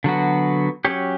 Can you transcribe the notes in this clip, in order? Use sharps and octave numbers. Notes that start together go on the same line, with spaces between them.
D3 F#3 B3 F#4
F#3 C#4 G4 C#5